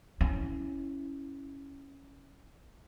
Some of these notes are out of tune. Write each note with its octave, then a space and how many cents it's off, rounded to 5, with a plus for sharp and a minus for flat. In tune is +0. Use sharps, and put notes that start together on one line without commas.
C#4 +0 E4 -10